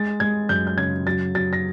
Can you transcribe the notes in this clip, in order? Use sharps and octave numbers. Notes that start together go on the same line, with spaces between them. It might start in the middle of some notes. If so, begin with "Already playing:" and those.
Already playing: G#3 A6
G#3 G#6
F#2 G6
G6
C#3 G#6
F#3 A6
F#3 A6
A#6